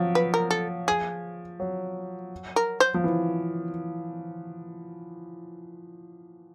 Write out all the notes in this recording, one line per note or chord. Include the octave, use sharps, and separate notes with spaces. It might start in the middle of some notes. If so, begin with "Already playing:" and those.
Already playing: F3 F#3
B4
A#4
A4
G#4
F#3
A#4
C5
F3
E3